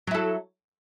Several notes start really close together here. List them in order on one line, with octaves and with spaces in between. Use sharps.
F#3 E4 A4